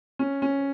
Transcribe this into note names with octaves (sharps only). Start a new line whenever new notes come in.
C#4
C#4